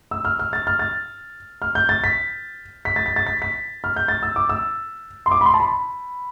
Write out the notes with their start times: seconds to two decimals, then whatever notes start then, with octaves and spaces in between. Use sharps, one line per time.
0.11 E6
0.25 F6
0.39 F6
0.53 A6
0.67 F6
0.79 A6
1.62 F6
1.75 G6
1.89 A6
2.04 B6
2.85 B6
2.96 A6
3.06 B6
3.16 A6
3.27 B6
3.42 B6
3.84 F6
3.96 G6
4.08 A6
4.23 E6
4.36 D6
4.49 E6
5.26 C6
5.31 D6
5.41 B5
5.46 C6
5.54 A5
5.60 B5